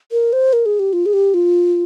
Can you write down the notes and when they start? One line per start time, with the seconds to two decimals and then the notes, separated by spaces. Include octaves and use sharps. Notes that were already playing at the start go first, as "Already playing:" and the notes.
0.12 A#4
0.33 C5
0.53 A#4
0.66 G#4
0.79 G4
0.93 F4
1.06 G#4
1.13 G4
1.34 F4